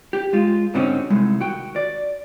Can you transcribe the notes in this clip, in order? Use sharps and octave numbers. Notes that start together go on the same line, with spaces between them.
G4
G#3 F4
G#2 D3 C4 C#4 D#4 F#4
C2 G#3 A3
D#3 F#4 G5
D5